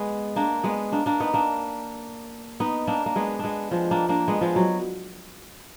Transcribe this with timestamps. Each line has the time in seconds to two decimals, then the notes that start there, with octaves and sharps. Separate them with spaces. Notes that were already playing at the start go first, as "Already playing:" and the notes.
Already playing: G#3 B3
0.36 A#3 D4
0.64 G#3 B3
0.92 A#3 D4
1.06 A#3 D4
1.20 B3 D#4
1.34 A#3 D4
2.60 B3 D#4
2.88 A#3 D4
3.06 A#3
3.16 G#3 B3
3.39 G#3 B3 D4
3.71 F3 G#3
3.91 A#3 D4
4.09 A#3 D4
4.28 G#3 B3
4.41 F3 G#3
4.56 F#3